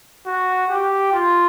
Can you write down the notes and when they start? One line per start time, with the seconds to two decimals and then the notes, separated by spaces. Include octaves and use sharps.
0.27 F#4
0.70 G4
1.12 F4